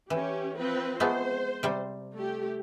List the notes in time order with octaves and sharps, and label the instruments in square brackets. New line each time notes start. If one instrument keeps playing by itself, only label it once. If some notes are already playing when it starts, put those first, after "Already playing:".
[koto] E3 [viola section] C#4 G4
[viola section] F3 C4 B4
[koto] G#3 A3 B3 [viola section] C5
[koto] C3 G3
[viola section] A3 G4